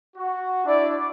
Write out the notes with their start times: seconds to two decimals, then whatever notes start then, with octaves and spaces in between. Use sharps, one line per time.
0.16 F#4
0.65 D4 E4 D5